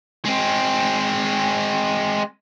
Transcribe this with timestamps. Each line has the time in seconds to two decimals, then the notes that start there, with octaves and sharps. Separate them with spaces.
0.25 G#3 C4